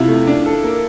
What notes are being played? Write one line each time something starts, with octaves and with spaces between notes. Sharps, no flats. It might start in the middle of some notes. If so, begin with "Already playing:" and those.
Already playing: C3 E4 F4
A3
D4
A4
A#3